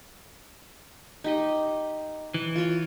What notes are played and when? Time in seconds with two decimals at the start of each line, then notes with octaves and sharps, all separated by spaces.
1.24 D#4 G4 D#5
2.34 E3
2.55 F4 C#5